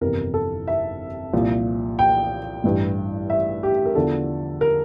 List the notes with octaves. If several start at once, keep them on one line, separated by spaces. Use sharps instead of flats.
G1 F2 C3 E3 A#4
A4
E5
C2 A#2 F3
G5
A1 G2 E3
E5
G4
A#4
E2 D3 F3 A4
A#4